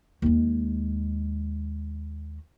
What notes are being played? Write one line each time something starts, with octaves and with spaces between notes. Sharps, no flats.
D#2 G#3